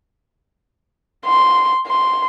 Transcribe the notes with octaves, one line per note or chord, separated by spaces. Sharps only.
C6
C6